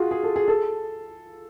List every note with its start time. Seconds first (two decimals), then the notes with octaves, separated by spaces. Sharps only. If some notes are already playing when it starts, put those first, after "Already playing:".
Already playing: F4 F#4 G#4
0.11 G#4
0.23 A4
0.36 G#4
0.48 A4